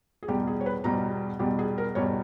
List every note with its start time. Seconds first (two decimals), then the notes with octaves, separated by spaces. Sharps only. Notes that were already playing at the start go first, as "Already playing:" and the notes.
0.23 G#4
0.28 E2 B2 G3 G4
0.47 G#4
0.61 C#5
0.66 B4
0.84 E2 B2 G3 A#5
1.39 E2 B2 G3 G4
1.59 G#4
1.78 A#4
1.95 E2 B2 G3 C#5